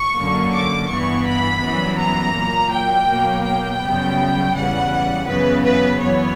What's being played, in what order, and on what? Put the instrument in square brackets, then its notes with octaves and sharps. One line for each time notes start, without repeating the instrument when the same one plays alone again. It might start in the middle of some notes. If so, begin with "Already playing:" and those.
Already playing: [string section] C#6
F#2 D3 A#3
D6
G2 E3 B3 C#6
B5
F#2 E3 G3 B3
A#5
A#2 F#3 A#3
G5
B2 F#3 A#3
G5
F#2 C#3 G3 B3
E2 C#3 G3 F#5
F#2 C#3 E3 B3 B4
B4
F#2 E3 B3 C#5